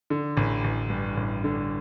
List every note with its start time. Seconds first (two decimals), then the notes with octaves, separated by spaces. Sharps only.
0.10 D3
0.37 A1
0.64 A1
0.90 G2
1.17 A1
1.44 D3